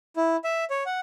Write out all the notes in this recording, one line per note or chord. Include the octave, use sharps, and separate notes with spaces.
E4
E5
C#5
F#5